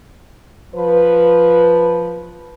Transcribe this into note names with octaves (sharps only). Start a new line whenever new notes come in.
F3 B4